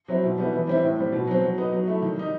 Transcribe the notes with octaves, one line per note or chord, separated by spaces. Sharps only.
F#3 C4 E4
B2
G3 B3 E4
E3
G3 C4 E4
A2
G3 C4
B2
F#3 C4
F#3
B3 D#4
F#3
A3 E4
D#3
G3 D#4